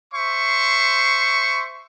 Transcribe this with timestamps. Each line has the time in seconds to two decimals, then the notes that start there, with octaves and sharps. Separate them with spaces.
0.13 C5 E5 C6 C#6